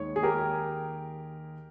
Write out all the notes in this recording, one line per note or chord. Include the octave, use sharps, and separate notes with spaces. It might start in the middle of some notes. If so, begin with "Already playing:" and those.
Already playing: D#2 D#3 G#3 C#5
G#4
G4 A#4